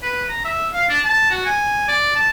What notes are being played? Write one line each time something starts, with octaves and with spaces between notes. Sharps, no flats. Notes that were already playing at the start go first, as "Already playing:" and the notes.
B4
A#5
E5
F5
D4
A5
F#4
G#5
D5
A5